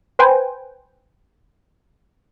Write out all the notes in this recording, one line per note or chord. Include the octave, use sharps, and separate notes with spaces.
B4 C5 G5 G#5